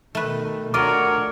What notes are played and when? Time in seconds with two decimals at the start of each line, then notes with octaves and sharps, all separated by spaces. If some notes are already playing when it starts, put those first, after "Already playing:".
0.15 B2 D#3 A3 B4
0.74 D2 D4 F4 F#4 A#4 C#5 D#5 D6